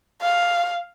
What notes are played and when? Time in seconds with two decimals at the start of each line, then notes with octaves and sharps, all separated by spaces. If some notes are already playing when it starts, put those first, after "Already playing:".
0.22 F5